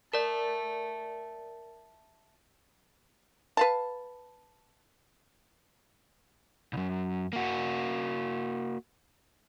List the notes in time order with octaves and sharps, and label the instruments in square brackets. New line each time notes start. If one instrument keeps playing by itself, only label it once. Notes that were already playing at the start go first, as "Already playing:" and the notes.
[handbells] A#4 D5 [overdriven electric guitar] E5 A5
[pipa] B4 F5 A5
[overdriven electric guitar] C2 F#2
A#3 F#4